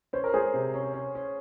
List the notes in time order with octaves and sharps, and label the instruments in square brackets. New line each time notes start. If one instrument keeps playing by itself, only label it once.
[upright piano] C#4 [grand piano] C5
[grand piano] A#4
[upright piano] G#3 [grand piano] G#4 C5
[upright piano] C3
C#4
C#4
C#4